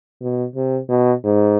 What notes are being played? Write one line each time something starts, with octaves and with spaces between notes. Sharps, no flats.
B2
C3
B2
G#2